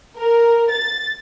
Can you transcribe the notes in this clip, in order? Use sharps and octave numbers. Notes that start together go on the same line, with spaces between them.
A#4
A6